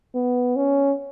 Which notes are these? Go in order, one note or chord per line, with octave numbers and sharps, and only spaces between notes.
B3
C#4